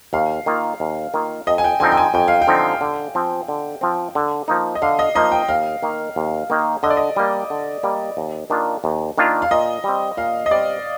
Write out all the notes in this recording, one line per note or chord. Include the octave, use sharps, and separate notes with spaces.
D#2 F5
D#3 A#3 F4
D#2
D#3 A#3 F4
F2 D#5
G#5
G5
D3 F3 C4 D#4 G#5
G5
G#5
F2 G5
F5
G5
D3 F3 C4 D#4
D3
F3 C4
D3
F3 C4
D3
F3 A#3 D#4
D#5
D3 F5
D#5
F3 A#3 D#4 D#5
G5
D#2 F5
D#3 A#3
D#2
D#3 A#3
D3 D#5
D5
D#5
G3 A#3
D3
G3 A#3
D#2
D#3 A#3 D4 F4
D#2
D#3 A#3 D4 F4
F5
A#2 D#5
G3 C4
A#2 F5
D#5
G3 C4 D5